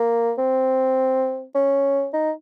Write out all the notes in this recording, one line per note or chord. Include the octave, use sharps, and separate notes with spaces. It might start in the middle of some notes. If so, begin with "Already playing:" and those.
Already playing: A#3
C4
C#4
D#4